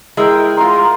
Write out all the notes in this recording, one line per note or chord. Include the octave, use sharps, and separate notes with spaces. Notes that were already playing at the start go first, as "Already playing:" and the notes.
G#3 E4 A#4 G5
F4 F#5 A#5 C6